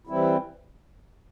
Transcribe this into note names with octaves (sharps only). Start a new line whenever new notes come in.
E3 G3 C4 E4